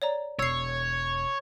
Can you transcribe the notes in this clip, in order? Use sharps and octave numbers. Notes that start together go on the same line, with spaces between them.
C#5 D5 A#5
E1 C#5 E6 C7